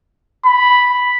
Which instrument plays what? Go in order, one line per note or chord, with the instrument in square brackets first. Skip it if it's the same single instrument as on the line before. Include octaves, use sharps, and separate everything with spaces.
[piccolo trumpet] B5